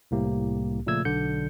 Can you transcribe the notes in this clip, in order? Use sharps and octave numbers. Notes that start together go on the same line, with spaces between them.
C2 A2 A#3 G4
A#2 C#3 F3 A3 E6 G#6
B1 D3 G6 C#7